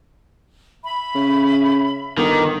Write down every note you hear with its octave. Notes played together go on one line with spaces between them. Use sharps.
E5 B5
C#3
G1 D#3 B4 D6